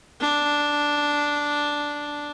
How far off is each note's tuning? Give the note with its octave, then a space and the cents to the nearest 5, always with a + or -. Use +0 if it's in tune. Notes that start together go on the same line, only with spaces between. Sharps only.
D4 -5